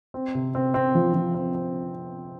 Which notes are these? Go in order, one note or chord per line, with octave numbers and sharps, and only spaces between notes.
C4
C3
C4
C4
F3
F3
C4
C4